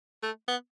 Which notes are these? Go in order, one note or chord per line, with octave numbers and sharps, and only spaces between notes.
A3
B3